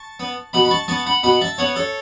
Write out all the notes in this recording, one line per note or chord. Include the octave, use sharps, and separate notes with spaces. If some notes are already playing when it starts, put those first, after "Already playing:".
Already playing: A5 C#6
B3
B2 F#5 B5
B5
A5 C#6
B3 A5 C#6
F#5 B5
B2 F#5 B5
E5 A5
B3 C#5 F#5
A4 C#5